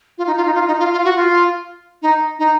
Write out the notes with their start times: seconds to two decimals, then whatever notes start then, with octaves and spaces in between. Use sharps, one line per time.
0.18 F4
0.27 D#4
0.37 F4
0.46 D#4
0.55 F4
0.67 D#4
0.79 F4
0.92 F4
1.05 F#4
1.16 F4
2.02 D#4
2.39 D#4